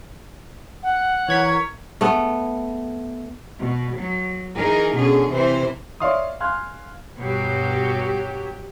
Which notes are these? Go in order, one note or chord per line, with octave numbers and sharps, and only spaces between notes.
F#5
E3 A#4 C#5 G#6 B6
A3 B3
B2
F#3
E3 D#4 G#4 A#4
B2 D3 C#4 G#4
C3 E3 E4 C5
C#5 D5 E5 F5 C6 D#6
F5 G#5 C6 F6 F#6 G#6
G2 B2 F#3 G4